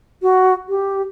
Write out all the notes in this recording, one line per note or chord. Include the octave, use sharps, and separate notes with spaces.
F#4
G4